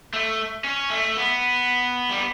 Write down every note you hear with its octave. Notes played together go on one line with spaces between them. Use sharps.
A3
C#4
A3
B3
G3